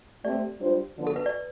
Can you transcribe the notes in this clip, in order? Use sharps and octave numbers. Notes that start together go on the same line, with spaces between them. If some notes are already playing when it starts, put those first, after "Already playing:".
A3 C4 G4 C5 D5
G3 D4 F4 C5
D3 F3 B3 D4
A4
B4
D5